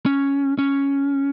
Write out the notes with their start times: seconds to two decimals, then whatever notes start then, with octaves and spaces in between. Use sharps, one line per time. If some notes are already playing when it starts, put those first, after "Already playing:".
0.06 C#4
0.59 C#4